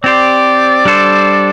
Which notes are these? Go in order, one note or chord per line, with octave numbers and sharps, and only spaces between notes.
C4 G4 C5 D5
G3 D4 A4 C5